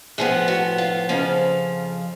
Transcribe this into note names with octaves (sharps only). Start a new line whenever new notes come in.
A2 F3 B3 G#4
F#4
F4
F2 C#3 F3 C#4